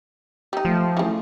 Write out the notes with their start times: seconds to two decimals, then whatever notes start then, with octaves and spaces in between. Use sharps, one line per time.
0.53 G3 D#4
0.65 F3 A3
0.97 C#3 E3